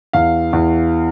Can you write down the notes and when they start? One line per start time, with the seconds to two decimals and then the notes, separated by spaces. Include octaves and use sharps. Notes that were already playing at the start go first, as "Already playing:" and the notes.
0.13 E2 F5
0.53 E2